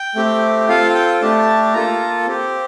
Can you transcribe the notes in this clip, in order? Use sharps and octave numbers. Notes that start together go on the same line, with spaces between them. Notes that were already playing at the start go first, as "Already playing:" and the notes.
Already playing: G5
A3 C4 G4
C4 F4 A4 F5
G5
A3 D4 G4 A5
A#3 F4 A4 A#5
C4 G4